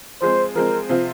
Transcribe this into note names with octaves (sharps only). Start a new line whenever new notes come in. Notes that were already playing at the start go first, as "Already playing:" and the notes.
F3 G#3 C4 C5
F3 G#3 C4 A#4
C3 F3 C4 F4